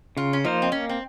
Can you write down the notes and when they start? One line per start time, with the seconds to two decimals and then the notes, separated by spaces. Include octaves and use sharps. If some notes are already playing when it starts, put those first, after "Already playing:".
0.17 C#3 F4
0.33 C#4
0.45 F3 A#3 D#4 F4 C5
0.62 C4
0.72 A#3 C#4
0.89 C4